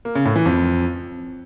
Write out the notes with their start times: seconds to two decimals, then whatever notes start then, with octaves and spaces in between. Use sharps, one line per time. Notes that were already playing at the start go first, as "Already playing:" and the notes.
0.05 A#3
0.15 C#3
0.25 A2
0.36 E3
0.46 F2